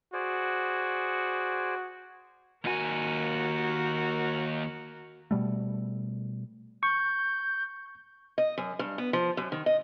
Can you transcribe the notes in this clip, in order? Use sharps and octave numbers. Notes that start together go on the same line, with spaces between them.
F#4 G#4 C5 D5
D#2 F#4 A#4 G#5
B2 G3 A3
C#6 G6
D#5
F#2
G2
B3
F3
F#2
D#3
D#5